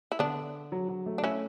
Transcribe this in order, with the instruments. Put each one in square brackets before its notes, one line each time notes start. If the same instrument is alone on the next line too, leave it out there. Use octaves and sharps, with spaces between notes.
[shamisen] E4
[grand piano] D3 [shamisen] B3 D4
[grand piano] F#3
F#3
A3
[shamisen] D4
[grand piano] A3 [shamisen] C#4 E4